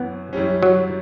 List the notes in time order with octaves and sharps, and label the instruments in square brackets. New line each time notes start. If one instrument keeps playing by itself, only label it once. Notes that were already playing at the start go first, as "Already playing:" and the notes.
Already playing: [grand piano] F#2 E3 C#4 [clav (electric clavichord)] B3
[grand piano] F#2 E3 G3 C#4
[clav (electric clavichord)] F#3